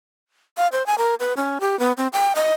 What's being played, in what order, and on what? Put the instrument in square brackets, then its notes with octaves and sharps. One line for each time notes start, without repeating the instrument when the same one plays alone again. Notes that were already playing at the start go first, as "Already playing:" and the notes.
[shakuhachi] F5
C5
G#5
A#4
B4
C#4
G4
B3
C4
G5
D#5